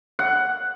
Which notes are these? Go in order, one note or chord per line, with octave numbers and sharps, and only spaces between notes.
F#5